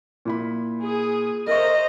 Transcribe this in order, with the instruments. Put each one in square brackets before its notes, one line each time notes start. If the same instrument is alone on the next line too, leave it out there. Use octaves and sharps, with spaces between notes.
[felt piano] A#2 E4 B5
[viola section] G#4
[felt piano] A#4 E5 C#6 [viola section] C5 A#5 [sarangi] D#5